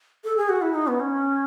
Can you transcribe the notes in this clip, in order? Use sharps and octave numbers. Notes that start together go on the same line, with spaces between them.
A4
G#4
F#4
E4
D#4
B3
C#4